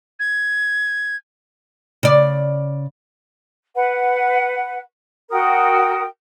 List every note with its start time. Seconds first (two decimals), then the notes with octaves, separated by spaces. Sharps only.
0.20 G#6
2.03 C#3 D5
3.75 B4 F#5
5.31 F#4 A#4 G5 D#6